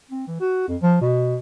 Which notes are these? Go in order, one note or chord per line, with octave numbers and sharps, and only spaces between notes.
C4
E3
F#4
F2
F3
B2